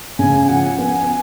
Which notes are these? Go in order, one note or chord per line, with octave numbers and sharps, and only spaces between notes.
C#3 G#5
G#5
F3 F#5
B3 G#5